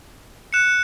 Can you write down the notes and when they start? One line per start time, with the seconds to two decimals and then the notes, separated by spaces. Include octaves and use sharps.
0.53 F#6 C#7 E7